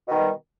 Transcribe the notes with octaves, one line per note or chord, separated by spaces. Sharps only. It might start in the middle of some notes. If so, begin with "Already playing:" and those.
B2 D#3 G3